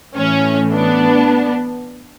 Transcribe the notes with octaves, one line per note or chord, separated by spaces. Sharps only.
A2 E3 A3 C#4
B3 D4